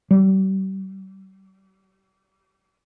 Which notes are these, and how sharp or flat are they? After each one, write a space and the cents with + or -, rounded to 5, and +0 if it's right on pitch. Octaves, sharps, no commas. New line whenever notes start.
G3 -40